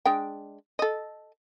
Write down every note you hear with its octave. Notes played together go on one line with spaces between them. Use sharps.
G#3 D4 G5
A4 D#5